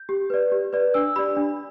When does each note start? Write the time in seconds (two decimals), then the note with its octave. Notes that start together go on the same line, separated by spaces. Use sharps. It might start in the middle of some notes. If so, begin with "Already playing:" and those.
Already playing: G6
0.09 G4
0.30 B4 D5
0.52 G4
0.73 B4 D5
0.94 D4 E6
1.16 G4 D5 B5
1.37 D4